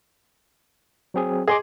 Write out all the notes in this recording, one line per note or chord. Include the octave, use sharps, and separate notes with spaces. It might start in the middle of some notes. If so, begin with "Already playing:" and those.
F#3 C4 G#4
G#4 D#5 C6 D6